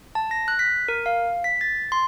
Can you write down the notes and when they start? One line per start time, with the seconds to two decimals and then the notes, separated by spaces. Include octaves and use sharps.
0.15 A5
0.31 A#6
0.48 F#6
0.59 B6
0.88 A#4
1.06 F5
1.44 B6
1.61 A6
1.92 C6